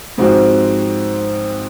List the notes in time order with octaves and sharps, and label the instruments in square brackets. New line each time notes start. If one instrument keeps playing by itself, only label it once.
[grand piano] G#2 F3 C4 F#4